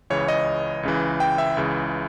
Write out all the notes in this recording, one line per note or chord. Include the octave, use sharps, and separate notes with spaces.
C#2 C#3 E3 C#5
D#5
C#2 C#3 E3
G5
E5
C#2 C#3 E3